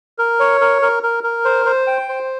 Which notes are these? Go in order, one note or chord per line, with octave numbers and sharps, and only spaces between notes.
A#4
C#5
A#4
A#4
A#4
A#4
C5
C5
G5
C5